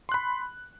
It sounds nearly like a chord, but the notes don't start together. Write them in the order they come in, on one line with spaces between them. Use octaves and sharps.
C6 F#6 B5